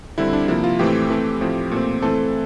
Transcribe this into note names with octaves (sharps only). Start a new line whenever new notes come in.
D3 G3 C4 E4
D4
C3 F3 A#3 E4
F4
A2 E3 A3 C4 G4
E3 A3 C4
A2 F3 C4
A#2 A3 C4
E3 A3 C4 A4